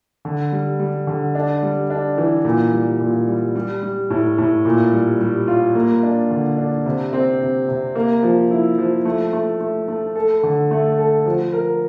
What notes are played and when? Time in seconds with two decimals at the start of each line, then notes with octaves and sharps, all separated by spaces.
0.25 D3
0.52 G3
0.80 G3
1.07 D3
1.35 D4
1.63 G3
1.90 D4
2.18 E3
2.45 A#2
2.73 G3
3.00 A#2
3.28 G3
3.55 G3
3.83 G3
4.10 A2
4.38 A2
4.65 A#2
4.93 G3
5.21 G3
5.48 F4
5.75 A#3
6.03 D4
6.31 D3
6.58 D4
6.86 C3
7.13 C4
7.41 C3
7.68 C3
7.95 A#3
8.23 F3
8.51 E4
8.78 F3
9.05 A3
9.33 A3
9.61 A3
9.88 A3
10.16 A4
10.43 D3
10.71 A3
10.98 A4
11.26 F3
11.53 A#4